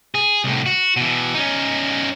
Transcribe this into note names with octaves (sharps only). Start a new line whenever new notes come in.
G#4
C2 A2
F#4
B2 E3
C#4 D#4